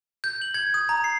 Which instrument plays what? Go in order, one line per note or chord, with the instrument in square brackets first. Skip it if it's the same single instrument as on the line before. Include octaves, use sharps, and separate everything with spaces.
[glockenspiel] G6
F#7
G#6
D#6
A#5
C7